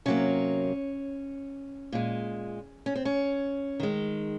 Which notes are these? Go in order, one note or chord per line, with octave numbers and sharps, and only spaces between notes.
C3 F#3 A#3 C#4
A#2 G#3
C#4
C4
C#4
D#3 G#3